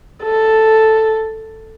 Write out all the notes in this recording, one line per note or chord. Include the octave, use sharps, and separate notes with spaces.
A4